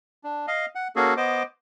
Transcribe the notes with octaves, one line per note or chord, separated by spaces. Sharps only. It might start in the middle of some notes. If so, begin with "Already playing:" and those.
D4
D#5 F5
F#5
A#3 C#4 F#4 G#4 A4
B3 C5 D#5 D6